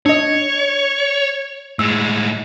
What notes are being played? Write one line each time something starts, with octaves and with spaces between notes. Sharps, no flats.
D4 C#5 D#5
A2 G#3 E6